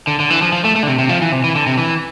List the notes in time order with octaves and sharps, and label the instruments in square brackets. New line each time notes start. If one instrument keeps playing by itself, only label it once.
[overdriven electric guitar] D3
D3
E3
F3
F3
A3
A3
D3
C3
C3
F3
E3
C3
E3
D3
C3
E3